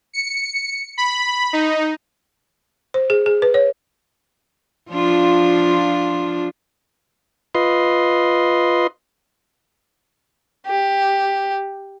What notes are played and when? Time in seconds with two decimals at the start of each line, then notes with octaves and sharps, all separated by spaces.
0.13 C#7
0.98 B5
1.53 D#4
2.94 C5
3.10 G#4
3.26 G#4
3.42 B4
3.54 C#5
4.91 F3 D4 F4
7.55 F4 B4 D#5 C6
10.66 G4